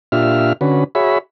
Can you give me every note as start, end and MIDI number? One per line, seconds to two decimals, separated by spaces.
0.12 0.53 46
0.12 0.53 62
0.12 0.53 65
0.12 0.53 67
0.12 0.53 76
0.12 0.53 89
0.61 0.84 50
0.61 0.84 61
0.61 0.84 66
0.61 0.84 71
0.95 1.18 66
0.95 1.18 68
0.95 1.18 73
0.95 1.18 76
0.95 1.18 83